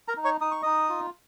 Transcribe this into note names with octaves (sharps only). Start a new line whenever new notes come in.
A#4 A#5
D#4
C#5 C#6
D#4 D#6
C#6
D#4 D#5 D#6
F4